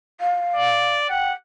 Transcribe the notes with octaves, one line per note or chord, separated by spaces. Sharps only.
F5
D5
F#5 G5